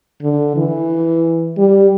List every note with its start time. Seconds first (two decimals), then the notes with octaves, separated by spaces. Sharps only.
0.22 D3
0.56 E3
1.57 G3